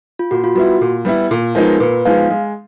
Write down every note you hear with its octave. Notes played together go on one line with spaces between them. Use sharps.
F4
A#2 F#4
F4
G3 B3 E4 F#4
A#2
G3 B3 E4
A#2
F3 G#3 B3 D#4 A#4
A#2 B4
F3 G#3 B3 D#4 F5
G#3